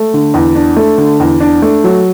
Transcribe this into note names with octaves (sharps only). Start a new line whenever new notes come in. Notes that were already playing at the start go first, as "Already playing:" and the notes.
Already playing: A3
D3
E2
D4
A3
D3
E2
D4
A3
F#3